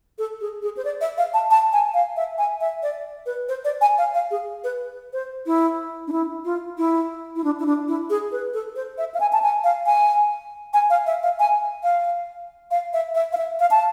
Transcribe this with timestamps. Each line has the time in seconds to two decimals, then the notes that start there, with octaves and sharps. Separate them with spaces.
0.18 A4
0.41 G#4
0.62 G#4
0.77 C5
0.85 D5
1.01 E5
1.18 F5
1.34 A5
1.51 A5
1.73 G#5
1.94 F5
2.16 E5
2.38 G#5
2.61 E5
2.83 D5
3.26 B4
3.49 C5
3.65 D5
3.81 G#5
3.98 F5
4.14 F5
4.31 G#4
4.64 B4
5.13 C5
5.46 E4
6.07 D4
6.12 E4
6.45 F4
6.78 E4
7.36 E4
7.44 D4
7.60 E4
7.66 D4
7.88 E4
8.10 G#4
8.32 B4
8.54 A4
8.76 C5
8.98 E5
9.14 F5
9.20 G#5
9.33 A5
9.42 G#5
9.64 F5
9.86 G#5
10.74 G#5
10.90 F5
11.06 E5
11.23 F5
11.39 G#5
11.83 F5
12.71 F5
12.93 E5
13.15 E5
13.32 F5
13.37 E5
13.60 F5
13.71 A5